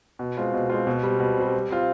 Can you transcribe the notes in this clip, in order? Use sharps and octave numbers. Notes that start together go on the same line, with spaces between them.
B2
G#3 C4 F4
B2
G#3 C4 F4
B2
G3 C4
B2
G3 C4
G3
C4 F4